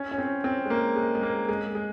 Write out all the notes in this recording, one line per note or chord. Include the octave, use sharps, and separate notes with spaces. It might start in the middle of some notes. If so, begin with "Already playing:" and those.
Already playing: C#4
C#4
C4
C4
G#3
A#3
G#3
G#3
A#3
G#3
G#3